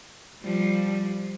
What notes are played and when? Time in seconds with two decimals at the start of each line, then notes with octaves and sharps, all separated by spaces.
0.43 F3 G3